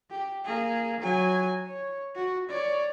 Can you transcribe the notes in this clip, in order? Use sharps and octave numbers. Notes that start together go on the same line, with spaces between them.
G4
A#3 G#4
F#3 G#5
C#5
F#4
C#5 D5